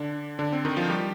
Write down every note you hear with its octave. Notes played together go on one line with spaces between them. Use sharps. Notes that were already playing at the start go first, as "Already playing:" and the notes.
Already playing: D3 D4
D3 D4
C4
D#3 D#4
F3 F4
G3 G4